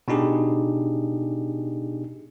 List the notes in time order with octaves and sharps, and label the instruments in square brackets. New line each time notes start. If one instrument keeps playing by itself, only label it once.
[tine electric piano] B2 D4 D#4 G4 G#4